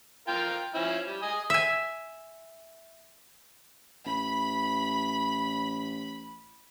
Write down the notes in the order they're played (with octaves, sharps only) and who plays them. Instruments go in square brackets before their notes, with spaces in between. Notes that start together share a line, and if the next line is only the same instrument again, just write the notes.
[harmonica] F4 A#4 G5
F3 C#4 E4
G3
D#5 G#5 D#6
[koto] E5 G#5
[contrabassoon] A1 [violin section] B5